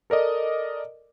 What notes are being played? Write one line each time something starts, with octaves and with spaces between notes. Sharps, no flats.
A4 A#4 D5 D#5